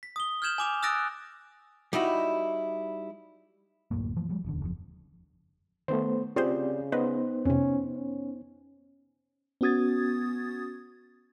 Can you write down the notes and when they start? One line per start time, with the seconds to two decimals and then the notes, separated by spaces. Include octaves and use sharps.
0.03 B6
0.16 D#6 G7
0.42 F6 G6 G#6 E7 F#7
0.58 G#5 D6 F7
0.83 D#6 E6 F#6 A6 A#6 D7
1.93 G3 D#4 E4 F#4
3.91 D1 F#2 A2 A#3
4.16 E3 F3 A3
4.29 F3 G3 G#3
4.44 D#1 E2 D3
4.62 F#1 F2
5.88 D#3 A3 B3 C5
6.36 C#3 C4 F4 G4 G#4 C5 D5
6.92 B3 D#4 B4 C5 D#5
7.45 F2 C3 C#4
7.96 C#4
9.61 B3 C#4 F#4 D#6 G#6 A6